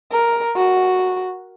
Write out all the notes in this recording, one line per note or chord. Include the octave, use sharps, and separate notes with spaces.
A#4
F#4